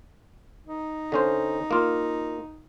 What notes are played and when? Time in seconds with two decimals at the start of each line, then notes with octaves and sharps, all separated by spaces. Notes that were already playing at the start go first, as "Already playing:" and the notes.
0.67 D#4
1.12 D3 C#4 C5
1.71 A#3 F4